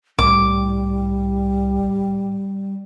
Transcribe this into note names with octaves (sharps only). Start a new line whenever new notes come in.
C2 A2 G3 D6